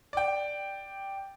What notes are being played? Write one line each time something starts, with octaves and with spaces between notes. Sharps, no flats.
D5 G5